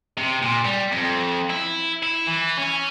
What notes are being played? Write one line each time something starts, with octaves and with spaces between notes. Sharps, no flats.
C3
A#2
G3
F2
E4
E4
E3
C#4